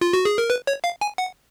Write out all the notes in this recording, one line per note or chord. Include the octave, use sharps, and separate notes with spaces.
F4
F#4
G#4
A#4
B4
C#5
F5
G#5
F#5